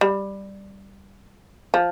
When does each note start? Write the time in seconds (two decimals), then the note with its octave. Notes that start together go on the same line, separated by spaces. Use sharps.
0.01 G3
1.74 F3